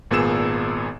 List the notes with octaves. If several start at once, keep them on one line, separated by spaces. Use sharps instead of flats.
G#1 A#2 B3 G#4 E6 E7